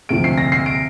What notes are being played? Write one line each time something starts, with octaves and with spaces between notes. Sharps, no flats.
D2 C3 F3 C4 D7
C7
A#6
C7
D7